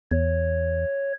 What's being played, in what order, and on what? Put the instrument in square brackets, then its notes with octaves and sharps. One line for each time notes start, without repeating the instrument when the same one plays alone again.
[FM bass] E2 [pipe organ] C#5